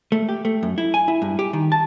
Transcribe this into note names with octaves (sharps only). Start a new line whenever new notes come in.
A3
G4
A3
F#2
E4
G#5
E4
G2
G4
D#3
A5